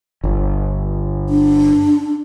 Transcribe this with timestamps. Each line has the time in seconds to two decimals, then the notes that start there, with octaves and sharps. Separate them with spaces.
0.24 G1
1.30 D4